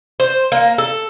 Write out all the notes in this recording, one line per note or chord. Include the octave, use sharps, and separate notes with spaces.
C5
A#3
A4